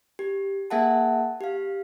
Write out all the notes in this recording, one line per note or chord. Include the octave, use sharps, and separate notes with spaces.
G4
A#3 G#4 E5 F#5 A5
G4 F5